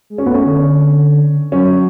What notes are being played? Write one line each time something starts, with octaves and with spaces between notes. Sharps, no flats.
G#3
C#4
A3 B3
C#4
D3
F#3 C#4